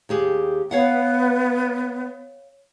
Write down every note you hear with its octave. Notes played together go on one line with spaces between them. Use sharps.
D#2 G4 G#4
B3 C#5 F5 F#5